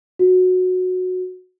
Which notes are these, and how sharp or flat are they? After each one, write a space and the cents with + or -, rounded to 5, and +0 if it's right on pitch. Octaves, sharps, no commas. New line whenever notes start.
F#4 -10